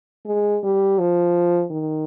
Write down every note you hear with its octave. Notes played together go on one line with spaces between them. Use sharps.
G#3
G3
F3
D#3